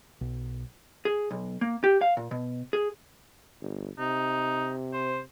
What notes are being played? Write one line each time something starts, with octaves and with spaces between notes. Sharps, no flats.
B1
G#4
B1
A#3
G4
F5
A#2
B2
G#4
G1
C3 D#4
C5